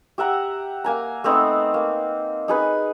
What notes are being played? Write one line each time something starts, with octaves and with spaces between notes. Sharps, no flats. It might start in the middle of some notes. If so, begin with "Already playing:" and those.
G4 E5 F#5 A#5
A#3 G#5 A#5
A3 B3 C4 D#4
A#3
D#4 G#4 B4